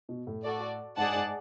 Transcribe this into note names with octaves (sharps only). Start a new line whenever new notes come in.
B2
A2
F#4 A4 D5
G#2 G#4 D5 F#5 A5
G#2